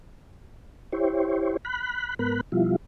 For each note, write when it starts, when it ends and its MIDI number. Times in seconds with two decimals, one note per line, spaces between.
0.93 1.57 64
0.93 1.57 67
0.93 1.57 72
0.93 1.57 73
1.65 2.15 83
1.65 2.15 90
2.19 2.41 44
2.19 2.41 59
2.19 2.41 70
2.19 2.41 83
2.19 2.41 90
2.52 2.76 47
2.52 2.76 53
2.52 2.76 55
2.52 2.76 64
2.52 2.76 65